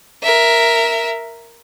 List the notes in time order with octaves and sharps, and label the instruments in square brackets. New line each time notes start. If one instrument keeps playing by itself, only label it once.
[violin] A#4 E5